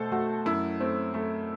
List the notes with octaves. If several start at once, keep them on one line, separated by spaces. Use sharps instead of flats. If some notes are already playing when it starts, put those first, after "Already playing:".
Already playing: B2 A3 A4 C5
A3 F#4
F#2 E4
A3 C4
A3